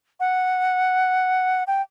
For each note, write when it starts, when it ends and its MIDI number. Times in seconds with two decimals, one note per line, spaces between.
0.20 1.64 78
1.67 1.82 79